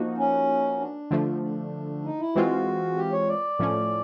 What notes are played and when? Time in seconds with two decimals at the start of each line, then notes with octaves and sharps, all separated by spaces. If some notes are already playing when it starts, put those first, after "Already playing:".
Already playing: F3 A#3 D#4 F#4
0.18 C#4
0.80 D4
1.11 D3 F3 A3
1.42 D4
2.04 D#4
2.20 E4
2.35 E3 G#3 C4 F4 F#4
2.97 G4
3.12 C#5
3.28 D5
3.59 A2 F3 A3 C#4